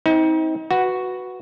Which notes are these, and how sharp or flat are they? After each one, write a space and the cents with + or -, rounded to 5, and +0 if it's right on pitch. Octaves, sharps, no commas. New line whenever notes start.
C4 +0 D#4 +40
F#4 +0 B4 +0